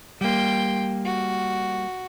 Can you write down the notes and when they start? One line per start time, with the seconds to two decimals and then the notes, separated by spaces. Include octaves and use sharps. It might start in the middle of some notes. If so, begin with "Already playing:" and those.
0.21 G3 A#3 G5 C6
1.05 F#4